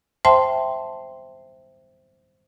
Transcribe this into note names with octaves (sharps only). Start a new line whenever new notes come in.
C5 E5 G5 A5 C6